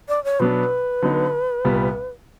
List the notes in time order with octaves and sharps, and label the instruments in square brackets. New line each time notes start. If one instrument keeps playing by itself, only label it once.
[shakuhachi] D5
C#5
[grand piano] B2 F#3 B3 D4 [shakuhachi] B4
[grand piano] D3 F#3 B3 D#4
C2 A#2 G3 B3